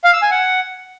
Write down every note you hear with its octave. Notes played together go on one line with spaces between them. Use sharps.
F5
E6
G#5
F#5